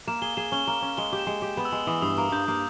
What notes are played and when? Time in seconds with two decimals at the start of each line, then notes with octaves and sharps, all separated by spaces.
0.07 A#3 E7
0.22 G#4 G7
0.37 G#4 E7
0.52 C#4 G7
0.67 A#3
0.82 C#4
0.97 G#3 G7
1.13 G4
1.19 E7
1.27 G#3
1.42 G4
1.57 B3
1.65 E6
1.72 G#3
1.87 E3 D#6
2.02 G2 D#6
2.18 A#3 E6
2.32 G2 G6
2.48 A#3